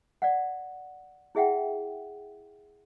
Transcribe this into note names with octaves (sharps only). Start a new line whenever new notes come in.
D5 F5 F#5
E4 G#4 E5 F#5 G5